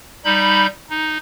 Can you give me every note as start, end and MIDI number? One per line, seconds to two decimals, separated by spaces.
0.25 0.66 55
0.25 0.66 63
0.25 0.66 83
0.25 0.66 91
0.89 1.17 63